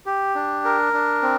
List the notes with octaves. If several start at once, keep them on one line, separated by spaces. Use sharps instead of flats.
G4
D4
A#4
D4
C4